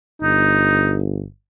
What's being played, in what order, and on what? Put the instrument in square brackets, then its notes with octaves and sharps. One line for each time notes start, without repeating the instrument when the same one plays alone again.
[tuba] G1 [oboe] D#4